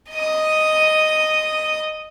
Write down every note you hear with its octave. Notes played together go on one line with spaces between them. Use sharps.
D#5 D#6